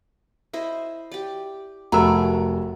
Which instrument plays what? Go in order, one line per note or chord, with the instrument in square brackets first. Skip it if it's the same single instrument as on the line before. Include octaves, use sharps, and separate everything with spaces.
[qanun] E4 C5 D#5
G4 D5
[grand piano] F1 B5 E6 [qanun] F#3 A3 G#5 [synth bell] A#4 A#5